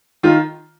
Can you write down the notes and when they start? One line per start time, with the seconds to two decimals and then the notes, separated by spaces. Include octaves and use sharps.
0.23 D#3 F4